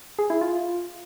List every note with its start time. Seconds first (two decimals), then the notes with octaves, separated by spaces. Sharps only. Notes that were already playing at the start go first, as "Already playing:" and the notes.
0.19 G#4
0.30 E4
0.41 F4